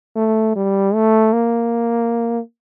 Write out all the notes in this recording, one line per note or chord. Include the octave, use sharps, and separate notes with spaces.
A3
G3
A3
A#3